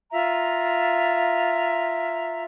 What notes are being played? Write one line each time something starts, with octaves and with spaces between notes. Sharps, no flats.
F4 E5 A#5